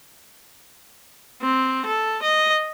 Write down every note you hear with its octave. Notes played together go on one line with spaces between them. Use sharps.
C4
A4
D#5